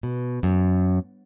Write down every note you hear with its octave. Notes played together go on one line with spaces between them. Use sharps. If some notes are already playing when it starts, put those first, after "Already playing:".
B2
F#2